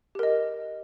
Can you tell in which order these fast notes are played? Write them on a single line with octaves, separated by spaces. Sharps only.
G4 A#4 D#5